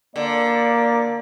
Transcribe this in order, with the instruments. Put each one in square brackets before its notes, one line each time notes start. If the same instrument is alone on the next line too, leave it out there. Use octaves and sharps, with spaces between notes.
[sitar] D3 [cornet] A#3 [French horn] D5